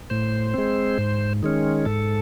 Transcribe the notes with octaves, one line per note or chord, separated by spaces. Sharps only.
A2 C5
G#3 C4
G#2
D#3 G#3 C#4
G#2 A4